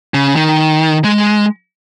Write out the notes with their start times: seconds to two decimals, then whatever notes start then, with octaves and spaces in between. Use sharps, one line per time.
0.14 C#3
0.36 D#3
1.04 G#3